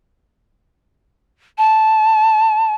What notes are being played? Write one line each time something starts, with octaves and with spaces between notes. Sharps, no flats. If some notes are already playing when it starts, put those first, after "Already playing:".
A5